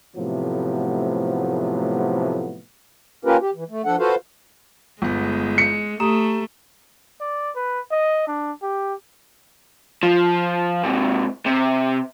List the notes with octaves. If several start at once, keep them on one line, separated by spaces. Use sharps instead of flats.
A2 C3 F3 F#3 A3 B3
A#3 C#4 F4 G4 A#4 B4
G4
E3
A3
F3 D4 A4 F#5
F4 F#4 A4 B4 C5 F5
G1 G#3 B3
C#7
A3 G4 A#5 D#6 E7
D5
B4
D#5
D4
G4
F3
G#2 C3
C3